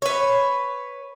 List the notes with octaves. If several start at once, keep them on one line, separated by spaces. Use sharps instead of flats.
B4 C#5